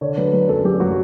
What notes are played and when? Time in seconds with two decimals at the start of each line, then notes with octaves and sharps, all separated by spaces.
0.01 D3 C#5
0.17 F#3 B4
0.33 F#3 B4
0.49 F#2 A4
0.64 F#2 G4
0.80 F#3 F#4